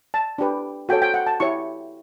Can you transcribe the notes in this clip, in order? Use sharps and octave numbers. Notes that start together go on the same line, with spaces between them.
A5
D4 G4 B4
F#4 A4 C#5 G5
G5
F#5
A5
E4 G4 C#5 C#6